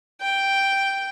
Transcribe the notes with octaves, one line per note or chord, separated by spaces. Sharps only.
G5